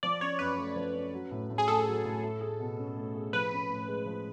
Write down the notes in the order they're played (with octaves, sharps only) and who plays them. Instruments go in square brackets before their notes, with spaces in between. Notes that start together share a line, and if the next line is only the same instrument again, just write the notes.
[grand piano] F3 [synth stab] D5
[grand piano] C#4 [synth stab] C#5
[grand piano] F#2 [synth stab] B4
[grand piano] A3
F3
C#4
F#3
A2
A2
[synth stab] G#4
[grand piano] A3 [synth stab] A4
[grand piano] F#3
A2
A3
G#4
B2
C#4
A3
G#4
[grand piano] F3 [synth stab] B4
[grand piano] C#4
A2
G#3
F3